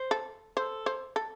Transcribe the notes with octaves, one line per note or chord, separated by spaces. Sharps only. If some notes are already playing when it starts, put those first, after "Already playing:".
Already playing: C5
A4
A4 C5
C5
A4